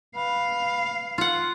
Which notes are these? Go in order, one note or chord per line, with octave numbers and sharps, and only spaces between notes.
B4 F5
F4 F#5